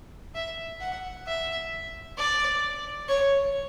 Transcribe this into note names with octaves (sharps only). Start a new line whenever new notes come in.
E5
F#5
E5
D5
C#5